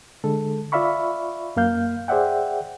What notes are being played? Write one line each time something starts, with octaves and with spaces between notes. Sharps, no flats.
D3 G#3 A4
F4 D5 E5 F5 B5 C#6
F#2 A#3 F5 G6
G#4 C5 D5 E5 F#5 G5